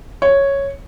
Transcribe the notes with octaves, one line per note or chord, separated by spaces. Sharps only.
C#5